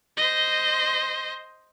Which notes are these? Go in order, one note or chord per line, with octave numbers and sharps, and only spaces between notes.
C5 D#5